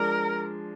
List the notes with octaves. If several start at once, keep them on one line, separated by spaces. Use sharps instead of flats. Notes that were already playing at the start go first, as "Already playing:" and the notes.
Already playing: F3 G#3 D4 A#4